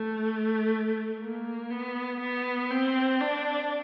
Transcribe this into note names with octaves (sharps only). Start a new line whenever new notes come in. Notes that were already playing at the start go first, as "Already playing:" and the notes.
Already playing: A3
A#3
B3
B3
C4
D4